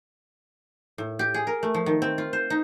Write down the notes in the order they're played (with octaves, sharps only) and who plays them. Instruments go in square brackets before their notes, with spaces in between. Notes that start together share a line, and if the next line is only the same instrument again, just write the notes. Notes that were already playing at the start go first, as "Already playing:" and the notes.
[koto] A2
G4
G#4
A#4
A3
F3
D#3
C4
F4
C5
D#4